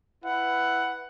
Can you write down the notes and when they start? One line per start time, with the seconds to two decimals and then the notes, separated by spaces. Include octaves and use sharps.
0.23 E4 B4 F#5